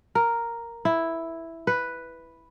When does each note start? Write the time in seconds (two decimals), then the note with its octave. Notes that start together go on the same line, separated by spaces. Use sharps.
0.15 A#4
0.85 E4
1.67 B4